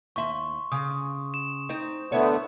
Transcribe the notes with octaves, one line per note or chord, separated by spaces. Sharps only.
D#2 E5 C6 C#6
C#3 D#6
E7
C4 D#4
D3 A3 B3 E4 C#5